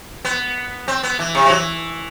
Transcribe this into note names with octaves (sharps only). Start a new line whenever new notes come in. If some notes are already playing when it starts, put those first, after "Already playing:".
B3
C4
B3
E3
C3
F#3
E3